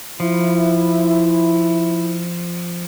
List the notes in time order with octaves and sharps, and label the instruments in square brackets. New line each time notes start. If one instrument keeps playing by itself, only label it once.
[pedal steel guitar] F3 [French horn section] E4